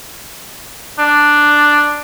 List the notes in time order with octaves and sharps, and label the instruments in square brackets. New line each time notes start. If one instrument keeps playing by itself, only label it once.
[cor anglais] D4